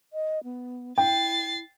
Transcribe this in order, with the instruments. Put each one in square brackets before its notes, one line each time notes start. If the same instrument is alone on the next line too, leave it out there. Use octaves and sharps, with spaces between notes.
[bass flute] D#5
B3
[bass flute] E4 [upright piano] G5 [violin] A6 C7